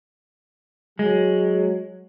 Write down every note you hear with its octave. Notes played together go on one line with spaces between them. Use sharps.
F#3 G#3